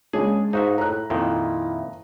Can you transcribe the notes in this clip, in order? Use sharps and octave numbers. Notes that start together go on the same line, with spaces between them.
C#3 G#3 D4 G#4
G#2 D#4 F#4 E5 F5
A2 A#5 F#6
F2 A#2 D#3 E4